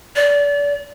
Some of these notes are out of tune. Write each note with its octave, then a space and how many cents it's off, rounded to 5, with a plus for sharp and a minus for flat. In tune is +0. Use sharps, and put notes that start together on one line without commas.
D5 -30